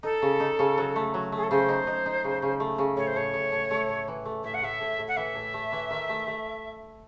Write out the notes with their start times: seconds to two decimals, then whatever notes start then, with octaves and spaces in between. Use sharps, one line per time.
0.03 D#4 A4
0.22 C#3
0.40 D#4
0.59 C#3
0.78 F#3
0.96 A3
1.14 F#3
1.32 A3 G#4
1.43 A4
1.50 C#3 C5
1.69 D#4
1.87 D#4
2.06 D#4
2.24 C#3
2.42 C#3
2.60 A3
2.78 C#3
2.97 A2 C#5
3.07 C5
3.15 A2 C#5
3.34 A2
3.52 A2
3.71 A3
3.89 A2
4.08 E3
4.25 A3
4.44 A2 E5
4.54 F#5
4.62 A2 E5
4.81 A2
4.99 A2
5.08 F#5
5.17 E3 E5
5.35 A2
5.54 A3
5.72 E3
5.90 D#3
6.09 A3
6.27 A3